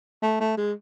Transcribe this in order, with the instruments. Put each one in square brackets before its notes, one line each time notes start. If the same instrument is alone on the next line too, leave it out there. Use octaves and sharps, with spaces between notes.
[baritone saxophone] A3
A3
G#3